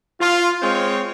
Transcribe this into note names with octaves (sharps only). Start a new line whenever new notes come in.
F4
G#3 C4 F4 C5 C#5